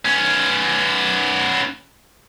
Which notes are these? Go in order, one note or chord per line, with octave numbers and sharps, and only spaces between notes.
B3 C#4